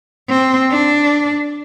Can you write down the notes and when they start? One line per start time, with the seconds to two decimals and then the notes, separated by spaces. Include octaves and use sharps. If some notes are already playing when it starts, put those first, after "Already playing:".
0.29 C4
0.72 D4